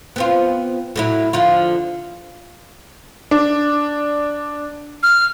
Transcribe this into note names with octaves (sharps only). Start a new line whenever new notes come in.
B3 C4 F4
A2 F#3 E4
D3 F3 F4
D4
F6